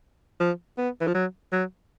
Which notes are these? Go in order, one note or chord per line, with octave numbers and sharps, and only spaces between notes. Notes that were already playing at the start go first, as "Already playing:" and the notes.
F3
B3
E3
F3
F#3
F#3